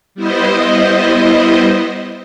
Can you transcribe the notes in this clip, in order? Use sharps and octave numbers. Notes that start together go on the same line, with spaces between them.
G3 B3 E4 C5 D#5